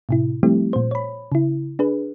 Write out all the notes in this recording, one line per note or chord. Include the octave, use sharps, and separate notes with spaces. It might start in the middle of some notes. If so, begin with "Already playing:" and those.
A2 C3 E4
F3 G3 A3 C4 E4 G4
A#2 C5
C#5 B5
C#3 E4
D4 G#4 B4